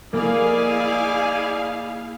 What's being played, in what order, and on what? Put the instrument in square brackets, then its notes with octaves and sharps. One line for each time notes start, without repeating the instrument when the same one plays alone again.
[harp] A#3 [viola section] E4 G#4 F5 [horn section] D5 D#5 G#5